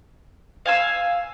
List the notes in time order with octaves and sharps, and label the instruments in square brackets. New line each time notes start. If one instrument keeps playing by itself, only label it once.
[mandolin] F5 G#5 E6